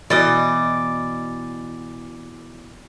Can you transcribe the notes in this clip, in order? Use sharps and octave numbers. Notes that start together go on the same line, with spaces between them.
B2 E3 D5 D#5